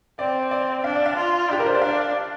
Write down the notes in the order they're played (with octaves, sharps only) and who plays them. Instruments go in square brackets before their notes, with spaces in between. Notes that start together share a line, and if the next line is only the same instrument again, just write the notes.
[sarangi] C4 [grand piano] D5
[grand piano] D5
[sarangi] D4 [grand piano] F5
[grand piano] D5
F5
[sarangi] F4
[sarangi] D4 [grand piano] G4
[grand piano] A#4
C5
D5
[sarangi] D4 [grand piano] F5